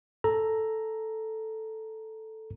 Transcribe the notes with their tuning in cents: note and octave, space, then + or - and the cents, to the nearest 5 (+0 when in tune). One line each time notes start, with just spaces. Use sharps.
A4 +0 A#5 +0